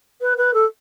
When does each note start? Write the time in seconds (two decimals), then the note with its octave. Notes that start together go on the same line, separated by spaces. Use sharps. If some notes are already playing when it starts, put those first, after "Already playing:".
0.21 B4
0.37 B4
0.54 A4